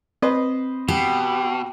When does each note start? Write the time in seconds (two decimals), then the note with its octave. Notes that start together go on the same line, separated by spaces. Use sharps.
0.22 C4 B4 C5 D#5
0.88 B2 G4